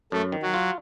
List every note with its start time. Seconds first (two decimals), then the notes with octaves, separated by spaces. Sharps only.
0.12 F#2 A3
0.32 D#3
0.43 F#3
0.54 F4